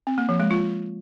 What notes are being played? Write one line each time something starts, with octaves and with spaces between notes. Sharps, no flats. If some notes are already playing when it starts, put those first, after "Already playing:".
C4
A#3
F3
G#3
F4